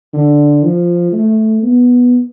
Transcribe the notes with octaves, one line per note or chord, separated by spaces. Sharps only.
D3
F3
A3
B3